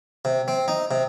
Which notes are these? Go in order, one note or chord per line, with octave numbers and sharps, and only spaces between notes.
C3
C4
D#4
C3